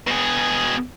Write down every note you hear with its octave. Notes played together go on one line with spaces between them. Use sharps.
B2 G#4